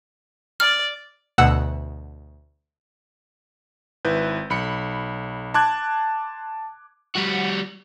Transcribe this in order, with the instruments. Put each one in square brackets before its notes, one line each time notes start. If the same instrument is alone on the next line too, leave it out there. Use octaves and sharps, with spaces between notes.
[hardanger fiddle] D5 [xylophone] F6
[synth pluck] D2 B2 F#5 E6
[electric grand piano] G#1 E4 B4 G6
B1 B5 C#7
A5 C6 D6 F#6 G#6
[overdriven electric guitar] G3 F#4